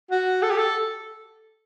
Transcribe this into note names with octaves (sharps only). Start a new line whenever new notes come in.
F#4
A4
G4
A4